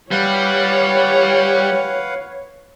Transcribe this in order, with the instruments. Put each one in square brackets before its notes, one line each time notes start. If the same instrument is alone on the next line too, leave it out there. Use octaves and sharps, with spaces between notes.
[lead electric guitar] G3 [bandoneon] B4 F5 F#5 [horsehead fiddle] C#5